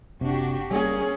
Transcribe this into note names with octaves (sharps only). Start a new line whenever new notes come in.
F#1 C3 D4 F#4 G4
G3 A#3 C#4 G#4